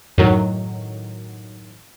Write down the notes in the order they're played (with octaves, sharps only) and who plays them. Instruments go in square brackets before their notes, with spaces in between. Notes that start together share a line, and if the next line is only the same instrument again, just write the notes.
[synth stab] F#2 A2 D#3 F#3